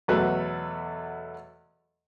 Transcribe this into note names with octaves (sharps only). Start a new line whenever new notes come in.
E2 B2 F#3 A3 B4